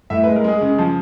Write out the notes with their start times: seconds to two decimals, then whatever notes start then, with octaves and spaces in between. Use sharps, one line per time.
0.10 A2 E5
0.24 B4
0.28 G#3
0.36 A#4
0.44 G#3 G#4
0.61 C#3
0.78 F3